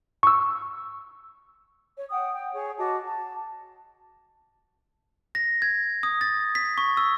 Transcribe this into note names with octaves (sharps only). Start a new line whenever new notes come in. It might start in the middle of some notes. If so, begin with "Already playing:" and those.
C#6 E6
C#5
F#5 G5 D#6
G5
G#4 C#5
F#4 D#5 A5 D6
A5
A#6
G#6
D#6
A6
B6
C#6
E6